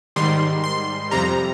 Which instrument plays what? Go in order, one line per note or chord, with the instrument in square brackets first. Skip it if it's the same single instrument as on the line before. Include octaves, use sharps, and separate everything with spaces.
[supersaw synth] G#2 D#3 G3 C6
C6
F2 C3 G3 A#5